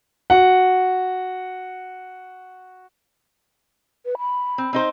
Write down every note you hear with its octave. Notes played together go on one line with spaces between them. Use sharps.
F#4 F#5
B4
B5
C4
C4 D#4 C5